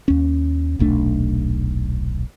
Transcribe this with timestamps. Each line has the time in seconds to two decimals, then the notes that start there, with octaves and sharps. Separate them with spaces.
0.08 D#2 C#4
0.79 D#1 B1 A3 D4